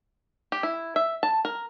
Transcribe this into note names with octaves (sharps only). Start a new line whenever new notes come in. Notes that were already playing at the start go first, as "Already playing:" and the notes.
G4
E4
E5
A5
A#4